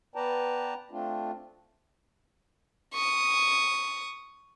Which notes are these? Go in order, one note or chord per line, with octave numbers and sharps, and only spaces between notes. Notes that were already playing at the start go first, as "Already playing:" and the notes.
B3 B4 D5 G5 A5 A#5
A3 C4 D4 F4
C#6 D#6